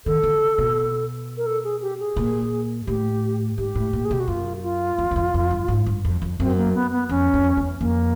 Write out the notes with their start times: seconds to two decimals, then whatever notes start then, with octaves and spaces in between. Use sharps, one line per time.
0.06 D#3 A4
0.23 D3
0.58 B2
1.37 A#4
1.46 A4
1.64 G#4
1.82 G4
2.00 G#4
2.16 A#2
2.87 A2 G4
3.58 G#2 G4
3.75 A2
3.93 A#2
4.05 G#4
4.11 B2 G4
4.20 F#4
4.28 F#2 F4
4.63 F4
4.98 F2
5.11 E2
5.16 F2
5.34 F2
5.51 G2
5.68 G#2
5.86 G2
6.05 F2
6.22 F2
6.40 F#2 C4
6.57 A#3
6.74 B3
6.92 B3
7.09 F2 C#4
7.34 F2
7.57 E2
7.80 F2 A#3